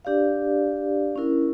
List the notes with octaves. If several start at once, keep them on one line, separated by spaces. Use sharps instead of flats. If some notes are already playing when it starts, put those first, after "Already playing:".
D4 G4 D5 F5
C#4 E4 A#4